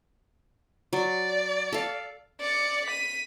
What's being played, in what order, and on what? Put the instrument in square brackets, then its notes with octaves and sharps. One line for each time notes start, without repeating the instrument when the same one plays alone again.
[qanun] F#3 [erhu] D5
[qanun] A4 F5
[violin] D5 C#7
B6 D#7